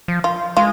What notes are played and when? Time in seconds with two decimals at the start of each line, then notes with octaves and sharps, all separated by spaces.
0.08 F3
0.24 F4
0.57 G#3 F4